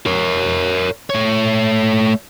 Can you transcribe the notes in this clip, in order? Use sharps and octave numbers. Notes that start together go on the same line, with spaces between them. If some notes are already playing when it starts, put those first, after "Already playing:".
A#4 C#5
A3 C#5